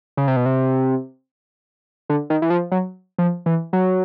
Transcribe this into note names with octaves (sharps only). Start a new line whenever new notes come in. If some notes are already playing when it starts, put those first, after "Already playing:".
C#3
C3
B2
C3
D3
D#3
E3
F3
F#3
F3
E3
F#3